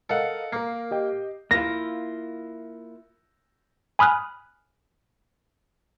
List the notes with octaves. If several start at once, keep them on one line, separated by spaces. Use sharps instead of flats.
A4 A#4 D#5 F5 F#5
A#3 A#4 C7
G4 D#5 G5
A#3 E4 F4 A#6
G#5 B5 D#6 F6 F#6